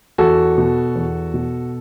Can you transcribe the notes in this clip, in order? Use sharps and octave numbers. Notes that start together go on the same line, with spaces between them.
E2 F#4 A4
B2
E2
B2